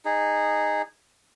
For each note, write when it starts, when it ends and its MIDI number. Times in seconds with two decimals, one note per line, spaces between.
0.05 0.82 63
0.05 0.82 68